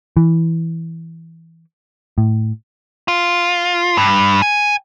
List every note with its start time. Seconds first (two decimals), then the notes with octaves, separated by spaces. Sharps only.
0.17 E3
2.18 A2
3.08 F4
3.97 G2
4.42 G#5